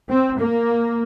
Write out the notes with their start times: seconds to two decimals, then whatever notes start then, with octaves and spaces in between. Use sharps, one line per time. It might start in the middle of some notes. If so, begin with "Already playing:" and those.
0.09 C4
0.38 A#3